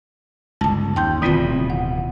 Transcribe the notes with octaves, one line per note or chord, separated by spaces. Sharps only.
G1 C#2 A5
D#2 G5 C6 G6
D1 B2 D#3 E3 C4 F4
F#5